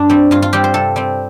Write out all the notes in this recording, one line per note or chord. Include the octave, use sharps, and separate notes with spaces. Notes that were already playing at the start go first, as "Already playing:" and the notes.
Already playing: G2 D4
G3 C4
G2 F4
F4
G3 C4 G4
C5
C3 A4
G3 C4